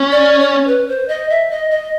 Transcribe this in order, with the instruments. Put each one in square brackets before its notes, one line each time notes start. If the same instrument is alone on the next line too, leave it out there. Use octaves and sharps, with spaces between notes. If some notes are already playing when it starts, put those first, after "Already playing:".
Already playing: [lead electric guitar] C#4
[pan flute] D5
C#5
B4
C5
D#5
E5
D#5
D#5